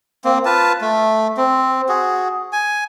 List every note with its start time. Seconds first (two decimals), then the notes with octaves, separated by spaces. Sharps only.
0.25 A#3 C4
0.45 F4 B4 A5
0.81 A3
1.37 C4
1.89 F#4 G#4
2.53 G#5